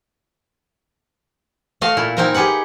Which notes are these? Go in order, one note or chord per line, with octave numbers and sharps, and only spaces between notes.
A3 F#4 D#5 F5
A#2 E4
C4 D#4 A#4 C5 G#5 A#5
G4 G#4 B4 F#5